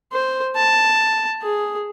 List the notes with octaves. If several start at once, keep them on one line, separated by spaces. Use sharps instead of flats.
C5
A5
G#4